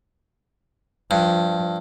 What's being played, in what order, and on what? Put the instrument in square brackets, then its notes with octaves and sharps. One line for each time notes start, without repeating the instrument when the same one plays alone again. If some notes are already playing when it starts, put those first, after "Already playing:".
[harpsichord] G2 [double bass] F3